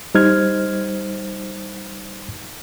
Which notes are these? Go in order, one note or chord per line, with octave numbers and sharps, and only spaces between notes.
G3 D#4 C5 F6 G#6